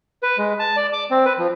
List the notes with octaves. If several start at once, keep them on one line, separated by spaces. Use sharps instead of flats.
B4
G#3
A5
D5
D6
C4
B4
F3